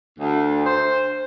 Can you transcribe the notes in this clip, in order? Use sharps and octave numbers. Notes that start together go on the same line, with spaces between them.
D2
C5